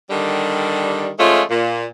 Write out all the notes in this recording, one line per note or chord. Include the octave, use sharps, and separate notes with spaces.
D3 D#3 G3
F3 G#3 A3 C#4 F4
A#2